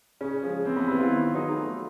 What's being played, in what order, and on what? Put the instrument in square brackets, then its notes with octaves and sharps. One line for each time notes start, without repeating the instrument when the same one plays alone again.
[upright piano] C#3 [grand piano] C#4
[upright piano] F3 G#3
[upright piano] E3 [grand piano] C4
[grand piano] B3
[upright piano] G3 [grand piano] E4
[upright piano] B3
[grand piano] F4
[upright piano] D#3
F#3 B3 D#4 G#4
A3